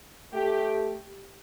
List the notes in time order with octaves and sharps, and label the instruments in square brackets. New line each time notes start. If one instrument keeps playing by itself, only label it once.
[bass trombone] A3 [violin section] G4